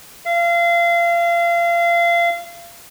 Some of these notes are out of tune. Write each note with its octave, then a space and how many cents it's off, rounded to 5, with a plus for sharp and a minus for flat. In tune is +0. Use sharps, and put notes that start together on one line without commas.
F5 -30